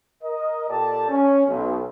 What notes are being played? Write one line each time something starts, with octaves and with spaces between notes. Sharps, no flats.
A#4 D#5
A#2 G4 A4 D5 G5 A5
C#4
B1